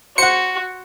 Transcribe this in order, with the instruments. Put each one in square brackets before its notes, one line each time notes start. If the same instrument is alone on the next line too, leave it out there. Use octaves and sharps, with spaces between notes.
[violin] F#4 [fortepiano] C5 F#5 [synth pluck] C#7